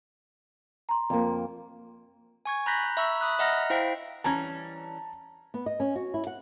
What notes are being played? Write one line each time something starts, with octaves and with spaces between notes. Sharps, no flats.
A#5 C6
F2 A#3
G#5 C#6 G#6
A#5 B5 F#6 G6 A#6 B6
E5 A#5 B5 C#6 E6
B5 D#6 F#6
D#5 E5 F#5 A#5 F6 A#6
E4 C5 F5 G5 B6
E3 G3 C#4 A5 A#5
B3
D#5
C#4
F#4
E4
F#5